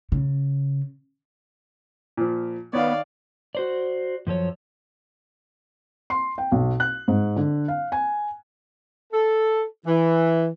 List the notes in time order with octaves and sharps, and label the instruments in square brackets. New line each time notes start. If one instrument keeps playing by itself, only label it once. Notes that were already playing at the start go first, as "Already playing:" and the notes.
[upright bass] C#3
[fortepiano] A#2 F3
[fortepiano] D#3 C#5 [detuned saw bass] B3 [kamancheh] D5 F5
[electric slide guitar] F#4 C5 D5
F#2 F3 A4 C#5
[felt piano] C6
G5
B1
F#6
G#2
D3
F5
G#5
[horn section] A4
E3